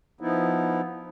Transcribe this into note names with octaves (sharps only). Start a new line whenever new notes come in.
F3 B3 D#4 E4